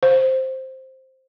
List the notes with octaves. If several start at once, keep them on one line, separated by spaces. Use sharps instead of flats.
C5